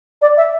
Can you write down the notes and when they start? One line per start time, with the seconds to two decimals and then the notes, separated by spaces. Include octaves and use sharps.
0.22 D5
0.37 E5